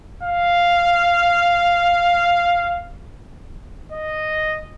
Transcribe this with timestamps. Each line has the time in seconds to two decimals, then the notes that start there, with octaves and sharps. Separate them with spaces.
0.23 F5
3.92 D#5